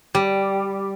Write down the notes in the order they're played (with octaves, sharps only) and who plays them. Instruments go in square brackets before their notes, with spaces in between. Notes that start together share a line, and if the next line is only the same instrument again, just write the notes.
[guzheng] G3